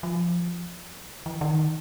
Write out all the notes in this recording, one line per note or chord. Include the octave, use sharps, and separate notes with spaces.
F3
E3
D#3